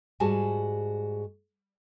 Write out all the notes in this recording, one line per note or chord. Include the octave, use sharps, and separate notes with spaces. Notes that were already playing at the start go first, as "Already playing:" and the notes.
G#2 G3 F#4 G#4 G#5 A5